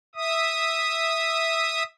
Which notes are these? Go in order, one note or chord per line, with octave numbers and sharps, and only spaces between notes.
E5 D#6